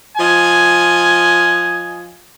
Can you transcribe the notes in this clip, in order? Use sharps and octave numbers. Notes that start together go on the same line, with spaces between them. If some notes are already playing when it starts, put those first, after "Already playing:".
F3 D#5 G#5